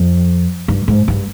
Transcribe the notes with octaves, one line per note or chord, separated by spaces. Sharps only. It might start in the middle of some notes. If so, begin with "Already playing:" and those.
Already playing: F2
G2
G#2
G2